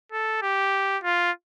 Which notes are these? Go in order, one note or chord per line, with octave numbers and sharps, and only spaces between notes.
A4
G4
F4